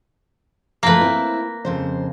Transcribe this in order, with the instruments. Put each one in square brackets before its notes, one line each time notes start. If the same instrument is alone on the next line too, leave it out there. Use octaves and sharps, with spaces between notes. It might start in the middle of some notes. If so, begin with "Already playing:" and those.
[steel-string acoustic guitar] F#2 F3 A3 [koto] A#3 B4
[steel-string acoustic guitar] C4 E4
F2 C#3 C5